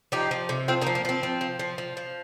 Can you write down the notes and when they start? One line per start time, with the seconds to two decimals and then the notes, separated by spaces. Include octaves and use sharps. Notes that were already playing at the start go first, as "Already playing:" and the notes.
0.12 F3 D#4 G4
0.31 F3
0.49 C3
0.68 F3 C4 F4
0.81 A#3 D#4
0.87 F3
0.95 A#3
1.05 F3 C4
1.23 F3
1.41 F3
1.59 F3
1.78 F3
1.97 F3